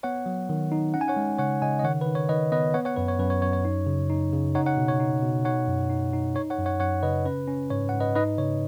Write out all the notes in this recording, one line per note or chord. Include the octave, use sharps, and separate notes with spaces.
B3 C#5 F#5
F#3
D#3
D#4
C#4 F#5
G#5
C#5 F#5
G#3
C#3 C#5 F#5
C#3 D#5 G#5
D#5
D#3 C#5 F#5
D#3 B4
C#5
D#3 B4 D#5
B3 B4 D#5
B3 C#5 F#5
C#5 F#5
F#2 B4
C#5
F#2 B4
C#5
F#2 C#5
C#5
D#4
C#3
D#4
C#3
D#4 C#5 F#5
C#5 F#5
B2
C#5
D#4
B2
D#4 C#5 F#5
F#2
D#4
D#4
D#4 C#5
C#5 F#5
F#2
C#5 F#5
F#2 C#5 F#5
C#3 B4 D#5
C#4 B4
C#4
G#2 C#5
G#2 F#5
B4 D#5
D#4 B4 D#5
C#3 C#5